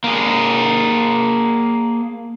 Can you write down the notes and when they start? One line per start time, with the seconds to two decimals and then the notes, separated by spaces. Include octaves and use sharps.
0.04 A#3 G#4